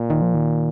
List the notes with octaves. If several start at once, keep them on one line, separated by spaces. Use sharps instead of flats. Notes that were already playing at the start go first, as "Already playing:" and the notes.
Already playing: A#2
D#3
F3
D#3